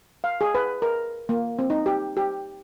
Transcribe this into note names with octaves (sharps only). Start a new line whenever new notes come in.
F5
G#4
B4
A#4
A#3
C4
D#4
G4
G4